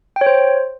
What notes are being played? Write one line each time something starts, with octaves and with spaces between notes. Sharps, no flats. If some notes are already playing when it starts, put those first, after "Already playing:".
G5
C#5
C5